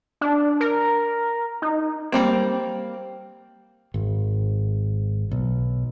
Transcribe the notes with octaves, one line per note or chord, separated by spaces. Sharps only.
D4
A#4
D#4
G3 A#3 C4
G#1
B1